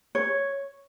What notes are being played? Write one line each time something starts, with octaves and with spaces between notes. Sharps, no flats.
C#5